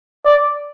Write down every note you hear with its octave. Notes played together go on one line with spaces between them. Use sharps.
D5